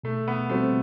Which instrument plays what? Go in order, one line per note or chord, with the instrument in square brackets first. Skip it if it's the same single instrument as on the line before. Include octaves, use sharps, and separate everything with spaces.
[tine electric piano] B2 [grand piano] A3
[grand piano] B3
[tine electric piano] G3 C4 F#4 C5 [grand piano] A3